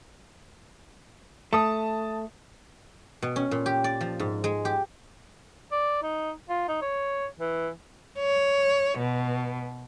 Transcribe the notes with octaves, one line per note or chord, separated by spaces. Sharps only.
A3 A5 D#6
B2
C#4
A#2
G4
D5
F3
G#2
G#3
G4
D5
D#4
F4
D#4
C#5
E3
C#5
B2